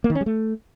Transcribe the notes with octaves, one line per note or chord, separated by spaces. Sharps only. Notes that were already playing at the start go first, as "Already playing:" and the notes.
A#3
D#3
C#4
G3
A3